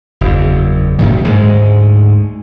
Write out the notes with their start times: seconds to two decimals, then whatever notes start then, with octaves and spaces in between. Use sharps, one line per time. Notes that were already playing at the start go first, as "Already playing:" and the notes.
0.21 F#1 E2
0.99 F#2 A#2 D#3
1.24 D2 G#2 G#3